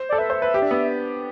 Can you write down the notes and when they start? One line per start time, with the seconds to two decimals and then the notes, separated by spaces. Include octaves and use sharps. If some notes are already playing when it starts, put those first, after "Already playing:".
Already playing: C5
0.09 A4 D5
0.18 B4 E5
0.30 C5
0.42 B4
0.54 G4
0.62 D4
0.71 B3